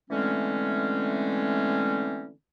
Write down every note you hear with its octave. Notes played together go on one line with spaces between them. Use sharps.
D3 E3 G#3 A3 C4 C#4